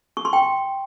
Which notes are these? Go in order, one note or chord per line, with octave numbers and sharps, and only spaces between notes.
C#6
C6
G5